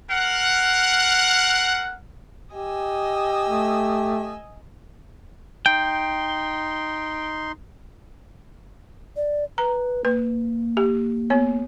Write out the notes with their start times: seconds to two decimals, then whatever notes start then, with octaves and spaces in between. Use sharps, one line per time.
0.10 A#4 F5 F#5
2.54 G4 D#5 G#5 E6
3.49 A3
5.66 D#4 G5 C6
9.16 D5
9.58 B4 A#5
10.05 A#3 B4
10.77 G4
11.30 B3 C#5